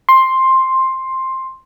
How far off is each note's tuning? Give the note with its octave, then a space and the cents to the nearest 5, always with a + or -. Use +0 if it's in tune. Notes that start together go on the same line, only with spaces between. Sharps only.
C6 +10